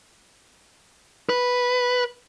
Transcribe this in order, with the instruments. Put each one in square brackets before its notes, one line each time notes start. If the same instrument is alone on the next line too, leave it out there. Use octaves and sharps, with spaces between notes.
[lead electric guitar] B4